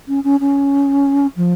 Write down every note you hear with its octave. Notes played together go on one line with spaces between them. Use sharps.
C#4
C#4
C#4
F3